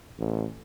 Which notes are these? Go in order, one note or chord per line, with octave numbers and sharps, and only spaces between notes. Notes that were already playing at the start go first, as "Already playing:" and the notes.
A1